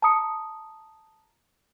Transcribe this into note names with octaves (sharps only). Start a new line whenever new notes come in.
A5 A#5 D#6 C#7